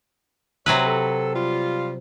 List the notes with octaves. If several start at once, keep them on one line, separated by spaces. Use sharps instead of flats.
C3 F#3 G4 B4 C#5
A4
G3 F4